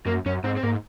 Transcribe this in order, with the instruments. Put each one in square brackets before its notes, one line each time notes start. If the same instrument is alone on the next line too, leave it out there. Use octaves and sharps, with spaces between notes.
[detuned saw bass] F#2 [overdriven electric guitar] A#3
[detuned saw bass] F#2 [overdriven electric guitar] C#4
[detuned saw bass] G#2 [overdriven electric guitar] C4
[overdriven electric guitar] C4
[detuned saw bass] G#2 [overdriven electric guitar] A#3